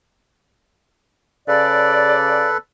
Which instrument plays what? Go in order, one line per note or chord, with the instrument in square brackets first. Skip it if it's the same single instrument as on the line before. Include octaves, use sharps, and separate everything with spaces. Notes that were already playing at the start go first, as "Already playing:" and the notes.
[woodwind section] C#3 D5 [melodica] A4 B4